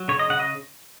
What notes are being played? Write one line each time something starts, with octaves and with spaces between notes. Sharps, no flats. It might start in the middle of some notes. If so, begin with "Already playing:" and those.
Already playing: F#3
C#3 C#5
D#5
C#3 F#5
D#5